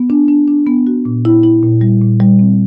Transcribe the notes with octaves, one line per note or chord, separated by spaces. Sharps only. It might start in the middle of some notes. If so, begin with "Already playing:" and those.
Already playing: B3
D4
D4
D4
B3
F#4
A#2
E4
E4
A#2
G3
A#2
G3
C4